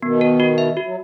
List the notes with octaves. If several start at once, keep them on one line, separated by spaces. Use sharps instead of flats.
B2 D#3 B3
A#4
F#4
E5
F#4
F#3